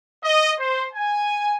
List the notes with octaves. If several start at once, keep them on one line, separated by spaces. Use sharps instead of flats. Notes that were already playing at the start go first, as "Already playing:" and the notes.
D#5
C5
G#5